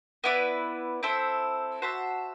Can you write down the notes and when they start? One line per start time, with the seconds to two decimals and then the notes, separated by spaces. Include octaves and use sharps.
0.24 B3 E4 B4 D5
1.03 C4 E4 A4 C5
1.82 F#4 C5 E5 A5